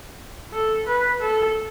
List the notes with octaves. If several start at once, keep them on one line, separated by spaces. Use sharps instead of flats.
A4
B4
A4